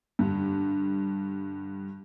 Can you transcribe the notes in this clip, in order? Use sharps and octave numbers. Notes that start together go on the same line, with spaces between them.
G2 D3